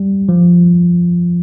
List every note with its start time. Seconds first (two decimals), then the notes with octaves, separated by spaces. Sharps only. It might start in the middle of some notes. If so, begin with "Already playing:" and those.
Already playing: G3
0.29 F3